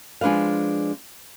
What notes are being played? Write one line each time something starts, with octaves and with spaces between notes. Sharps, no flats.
F3 G#3 D4 B4 F5